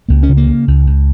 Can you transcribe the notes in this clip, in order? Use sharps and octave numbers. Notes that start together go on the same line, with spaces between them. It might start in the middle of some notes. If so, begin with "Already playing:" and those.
C#2 A#3
C#4
C#3
A#3
C#3
C#2
C#2